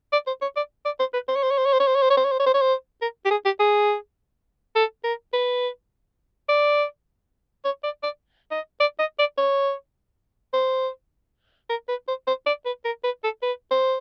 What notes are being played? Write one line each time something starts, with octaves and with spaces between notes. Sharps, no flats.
D5
C5
C#5
D5
D5
C5
B4
C5
C#5
C5
C#5
C5
C#5
C5
C#5
C5
C#5
C5
C#5
C5
C#5
C5
C#5
C5
C#5
C5
A#4
G4
G#4
G4
G#4
A4
A#4
B4
D5
C#5
D5
D5
D#5
D5
D#5
D5
C#5
C5
A#4
B4
C5
C5
D5
B4
A#4
B4
A4
B4
C5